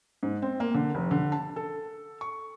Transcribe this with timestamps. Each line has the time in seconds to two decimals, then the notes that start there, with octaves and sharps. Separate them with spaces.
0.23 G#2
0.42 C4
0.60 A#3
0.74 D3
0.95 F1
1.11 D3
1.32 A5
1.56 A4
2.21 C#6